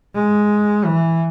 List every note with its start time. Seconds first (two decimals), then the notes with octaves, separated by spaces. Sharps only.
0.15 G#3
0.85 E3